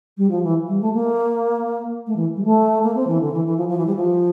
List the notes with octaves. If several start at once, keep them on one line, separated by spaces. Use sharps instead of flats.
G3
F3
E3
G3
A3
A#3
A3
E3
G3
A3
A#3
C4
E3
D3
E3
E3
F3
F3
E3
G3
F3